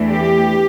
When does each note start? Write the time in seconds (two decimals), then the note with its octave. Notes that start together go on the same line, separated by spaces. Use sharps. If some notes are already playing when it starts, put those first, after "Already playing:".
Already playing: E2 E3 A3 D4
0.10 G4